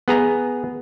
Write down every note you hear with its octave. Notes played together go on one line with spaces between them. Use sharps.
B3 G#4 A#5